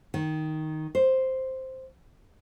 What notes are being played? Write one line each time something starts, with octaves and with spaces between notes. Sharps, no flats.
D#3
C5